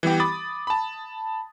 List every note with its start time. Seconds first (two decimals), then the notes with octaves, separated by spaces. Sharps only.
0.03 E3 G3 B3 G4
0.20 B5 D6 D#6 A6
0.67 A5 B5